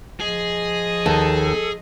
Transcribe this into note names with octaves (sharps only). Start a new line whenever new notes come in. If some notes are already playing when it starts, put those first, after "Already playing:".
F3 G#4 D#5
D#2 A4